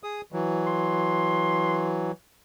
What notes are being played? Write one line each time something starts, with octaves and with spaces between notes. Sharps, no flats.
G#4 D#6
E3 F#3
C6